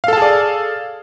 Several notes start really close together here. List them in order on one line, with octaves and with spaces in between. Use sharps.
F5 A4 A5 G#4 D5